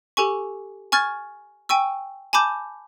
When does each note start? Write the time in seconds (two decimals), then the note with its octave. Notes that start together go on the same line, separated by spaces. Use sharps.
0.17 G4 A4 G#5 C#6
0.92 G#5 C#6 F6 G#6 A6
1.69 G5 G#5 C#6 E6
2.33 G#5 A5 B5 D6 G6